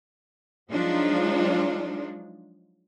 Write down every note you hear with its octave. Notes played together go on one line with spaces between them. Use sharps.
F3 F#3 G#3 D4 D#4 F4